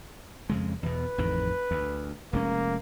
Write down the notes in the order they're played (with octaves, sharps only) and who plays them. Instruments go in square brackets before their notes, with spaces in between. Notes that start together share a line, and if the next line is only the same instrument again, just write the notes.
[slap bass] F2 C#3 G#3
[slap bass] E2 B2 [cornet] B4
[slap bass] A1 F2 D#3
D2
[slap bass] F1 G#3 C#4 [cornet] A#3